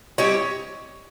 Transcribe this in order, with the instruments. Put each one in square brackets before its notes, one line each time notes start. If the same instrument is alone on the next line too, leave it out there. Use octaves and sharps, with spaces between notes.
[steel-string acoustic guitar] G3 C4 E4 G4 [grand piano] C#5 D#5